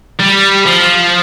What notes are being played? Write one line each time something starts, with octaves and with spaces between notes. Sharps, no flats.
G3
F3